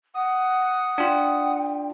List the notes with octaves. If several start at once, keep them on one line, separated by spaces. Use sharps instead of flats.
F#5 D#6
D4 F4 G5